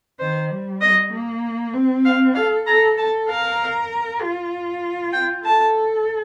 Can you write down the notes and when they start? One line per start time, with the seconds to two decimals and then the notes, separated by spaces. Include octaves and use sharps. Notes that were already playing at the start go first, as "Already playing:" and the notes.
0.20 D#3 C5
0.50 G3
0.81 D#5
1.12 A#3
1.73 C4
2.05 F5
2.35 A4 F5
2.67 A4 A#5
2.97 A4 A5
3.28 A#4 F5
4.21 F4
5.13 G5
5.44 A4 A5